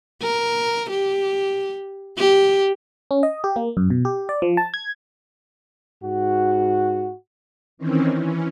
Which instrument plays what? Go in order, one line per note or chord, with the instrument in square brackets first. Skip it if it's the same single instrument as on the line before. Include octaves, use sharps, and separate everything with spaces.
[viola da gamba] A#4
G4
G4
[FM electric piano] C#4
D#5
G4
A#3
F#2
B2
G4
D5
F3
A5
G#6
[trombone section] G#2 F#4
[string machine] D#3 E3 C4 C#4
E3 C#4